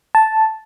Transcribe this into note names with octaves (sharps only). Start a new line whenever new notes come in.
A5